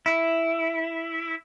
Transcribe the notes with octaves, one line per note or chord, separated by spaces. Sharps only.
E4